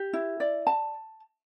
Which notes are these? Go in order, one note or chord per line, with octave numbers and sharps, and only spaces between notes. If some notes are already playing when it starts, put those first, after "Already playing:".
Already playing: G4
E4
D5
A5